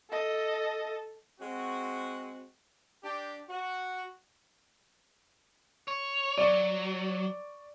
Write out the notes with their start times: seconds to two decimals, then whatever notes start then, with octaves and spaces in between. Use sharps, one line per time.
0.10 A4 D#5
1.40 G#3 C4 F#4
3.03 D4 G4
3.49 F#4
5.88 C#5
6.38 F#3 D5 C#6